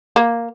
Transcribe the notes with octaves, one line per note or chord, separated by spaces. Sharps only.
A#3